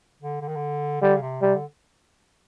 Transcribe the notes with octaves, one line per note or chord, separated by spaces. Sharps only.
D3
D3
D#3
D3
D3 G3
C#3
C3
C3 G3
D3